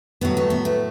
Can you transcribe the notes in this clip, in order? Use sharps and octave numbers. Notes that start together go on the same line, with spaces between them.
A2 F#3 B3
A3
B3
A3